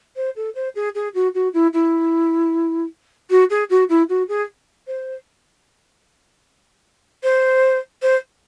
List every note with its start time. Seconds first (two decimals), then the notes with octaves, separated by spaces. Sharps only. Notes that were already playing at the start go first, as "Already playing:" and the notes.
0.16 C5
0.36 A4
0.55 C5
0.75 G#4
0.94 G#4
1.14 F#4
1.34 F#4
1.53 E4
1.73 E4
3.30 F#4
3.50 G#4
3.70 F#4
3.89 E4
4.09 F#4
4.28 G#4
4.87 C5
7.23 C5
8.02 C5